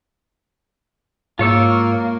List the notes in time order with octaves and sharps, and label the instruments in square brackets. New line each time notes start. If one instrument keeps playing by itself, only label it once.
[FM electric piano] G#2 [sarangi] A#3 [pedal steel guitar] F4 C#5 E6